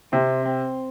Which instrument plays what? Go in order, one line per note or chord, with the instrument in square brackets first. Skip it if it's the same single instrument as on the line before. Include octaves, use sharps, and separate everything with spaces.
[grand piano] C3 [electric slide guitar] C4
[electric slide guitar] C4